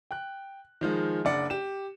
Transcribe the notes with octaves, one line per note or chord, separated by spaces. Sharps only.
G5 F#6
D#3 F3 G#3
F#1 D4 D5 F#5 C#7
G4 E7